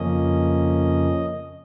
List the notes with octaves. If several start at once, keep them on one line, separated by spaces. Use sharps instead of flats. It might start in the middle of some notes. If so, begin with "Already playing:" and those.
Already playing: F2 C#3 F3 A#3 C#4 D#5